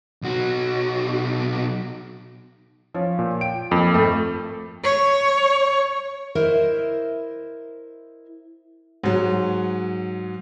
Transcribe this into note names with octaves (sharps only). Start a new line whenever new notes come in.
B1 F#4
F3 C#4
A#2
G5 D7
F2 A#3
G#1 A3
C#5
E4 A#4 C5 D#5 E5
G#2 F#3